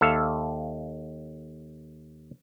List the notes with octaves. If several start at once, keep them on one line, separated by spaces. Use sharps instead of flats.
D#2 A4 E5 F5